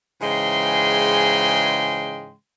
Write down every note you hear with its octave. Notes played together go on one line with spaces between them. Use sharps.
G#2 C#3 E3 G#3 G5 C6